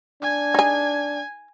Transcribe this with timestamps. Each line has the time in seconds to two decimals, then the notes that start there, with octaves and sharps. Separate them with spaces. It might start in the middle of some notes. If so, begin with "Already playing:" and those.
0.22 D4 G#5 G#6
0.54 D#4 G#4